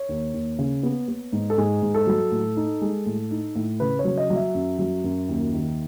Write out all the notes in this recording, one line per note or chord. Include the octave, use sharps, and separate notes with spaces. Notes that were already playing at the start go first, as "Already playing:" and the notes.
Already playing: C#5
D#2
D#2
C#3
B3
B3
G#2
A4
G#2 G#4
G#2
A4
F#3
A2
D#4
G#3
A2
D#4
A2
C#3 B4
C#5
F#3
D#5
F#3
E5
F#2
F#3
F#2
D#2
D#3